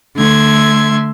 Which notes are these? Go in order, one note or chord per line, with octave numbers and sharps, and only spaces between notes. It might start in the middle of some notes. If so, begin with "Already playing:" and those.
D3 A3 E5 C6 G#6